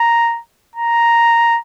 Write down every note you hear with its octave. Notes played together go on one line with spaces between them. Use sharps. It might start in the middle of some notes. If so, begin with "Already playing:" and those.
Already playing: A#5
A#5